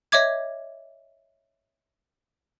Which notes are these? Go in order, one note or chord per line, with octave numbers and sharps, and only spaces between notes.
C#5 D#5 E5 D6 G#6